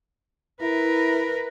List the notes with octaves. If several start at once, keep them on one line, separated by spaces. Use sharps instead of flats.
E4 A#4 B4